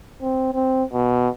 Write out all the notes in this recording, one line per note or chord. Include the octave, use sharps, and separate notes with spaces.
C4
C4
B2